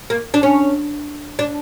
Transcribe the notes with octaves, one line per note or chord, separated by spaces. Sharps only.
A#3
D4
C#4
D4